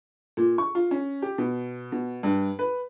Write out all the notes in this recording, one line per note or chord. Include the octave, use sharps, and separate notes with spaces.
A#2
C#6
F4
C#4
G4
B2
B2
G2
B4